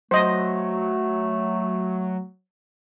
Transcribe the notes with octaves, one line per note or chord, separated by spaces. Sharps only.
F#3 A3 C5 D#5